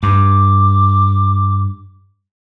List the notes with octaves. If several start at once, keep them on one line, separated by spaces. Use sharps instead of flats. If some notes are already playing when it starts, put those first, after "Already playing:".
G2 D6